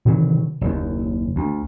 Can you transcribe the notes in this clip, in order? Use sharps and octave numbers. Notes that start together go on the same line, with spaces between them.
C3 D#3 E3 F#3
F#1 D#2
D2